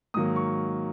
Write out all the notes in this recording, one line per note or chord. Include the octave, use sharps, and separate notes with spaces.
G#2 D#3 F#3 A#3 D#6
C#6